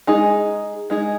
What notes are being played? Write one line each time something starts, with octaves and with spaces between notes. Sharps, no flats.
G#3 D#4 G#4
G#3 D#4 G#4